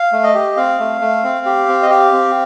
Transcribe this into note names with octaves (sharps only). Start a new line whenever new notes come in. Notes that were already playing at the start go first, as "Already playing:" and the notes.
Already playing: F5
A3
D#5
G4
C4 F5
A3
A3
C4
G4
C4
D#5
G4 F5
C4